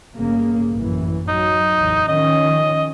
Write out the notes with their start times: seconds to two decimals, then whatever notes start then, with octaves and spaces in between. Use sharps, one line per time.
0.17 G1 C#3 A#3
0.72 A1 F#2 E3
1.28 F#3 D#4
1.78 A1 E2
2.08 D#3 F3 C#4 D#5